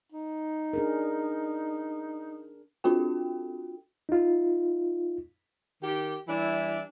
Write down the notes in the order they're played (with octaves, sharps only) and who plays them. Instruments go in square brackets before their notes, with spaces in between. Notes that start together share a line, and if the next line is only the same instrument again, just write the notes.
[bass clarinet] D#4
[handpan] D4 G#4 A#4
[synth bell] C4 D4 F4 F#4 A4 G5
[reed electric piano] D#4 F4
[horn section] D#3 G4
E3 G3 D4 E4